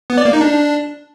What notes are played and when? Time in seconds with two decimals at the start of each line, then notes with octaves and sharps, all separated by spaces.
0.10 B3
0.18 D5
0.25 A#3
0.33 D#4
0.41 D4